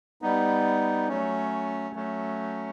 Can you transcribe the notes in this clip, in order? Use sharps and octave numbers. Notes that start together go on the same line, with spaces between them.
G3 B3 D#4
F#3 A3 C#4
F#3 A3 C#4